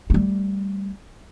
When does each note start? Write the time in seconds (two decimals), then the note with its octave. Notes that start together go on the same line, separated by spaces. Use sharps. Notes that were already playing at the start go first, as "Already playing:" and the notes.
0.10 G3 A3